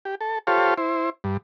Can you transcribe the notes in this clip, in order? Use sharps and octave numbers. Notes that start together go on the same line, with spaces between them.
G4
A4
F4 G4 A4 C5 C#5 F5
E4 C5
G2